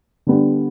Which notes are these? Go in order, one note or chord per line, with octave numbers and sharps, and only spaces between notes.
D3 G3 B3 D4